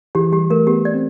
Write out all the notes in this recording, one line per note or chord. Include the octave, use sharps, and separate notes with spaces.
E3 G4
G3 G4
A3 A#4
B3 G4
D5
C4